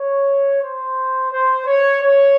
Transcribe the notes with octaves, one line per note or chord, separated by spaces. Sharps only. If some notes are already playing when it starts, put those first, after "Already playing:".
Already playing: C#5
C5
C5
C#5
C#5